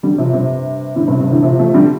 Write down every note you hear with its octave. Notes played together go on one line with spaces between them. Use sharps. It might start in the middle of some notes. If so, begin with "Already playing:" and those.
D3 G3
C3 F3
G2 C3
A2 D3
G2 C3
G2 C3
A2 D3
C3 F3
F3 A3
D3 G3